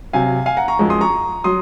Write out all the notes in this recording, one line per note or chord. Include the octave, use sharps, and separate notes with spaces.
C3 F#3 F5 G#5
F5 G#5
F#5 A#5
A#5 C#6
F#2 F3 G#3
C6 D#6
A#5 C#6
F#3 C6 D#6